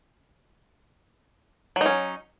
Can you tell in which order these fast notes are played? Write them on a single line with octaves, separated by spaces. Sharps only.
F#3 D#4 C#4